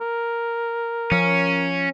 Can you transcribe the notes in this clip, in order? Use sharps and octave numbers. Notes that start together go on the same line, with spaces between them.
A#4
F3 C#4